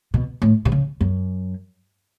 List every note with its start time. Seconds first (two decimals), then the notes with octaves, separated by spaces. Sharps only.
0.14 B2
0.42 A2
0.65 B2
0.72 C#3
1.01 F#2